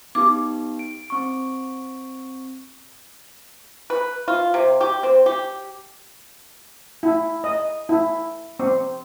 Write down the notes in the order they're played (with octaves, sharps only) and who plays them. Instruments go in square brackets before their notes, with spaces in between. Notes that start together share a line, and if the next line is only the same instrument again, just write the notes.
[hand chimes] B3 D#4 G4 [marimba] D6
[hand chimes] D7
C4 C#6 D7
[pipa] B4
F4
C3
G4
C4
G4
[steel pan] E4
D#5
E4
C4